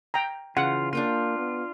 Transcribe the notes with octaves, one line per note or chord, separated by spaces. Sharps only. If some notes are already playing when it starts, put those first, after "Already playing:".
G5 A#5
C#3 E3 F4 F#5
A#3 D4 F4 G5 C6
B3